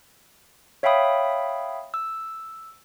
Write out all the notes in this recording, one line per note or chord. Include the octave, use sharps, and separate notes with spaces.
C#5 E5 F5 G5 B5 D#6
E6